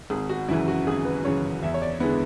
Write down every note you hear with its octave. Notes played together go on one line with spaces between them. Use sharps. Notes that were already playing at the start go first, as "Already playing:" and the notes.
G#1 G#4
F#4
F#2 C#3 E3 E4
F#4
G#1 G#4
B4
F#2 C#3 E3 C#5
E2 E5
C#5
D5
D3 G#3 B3 E4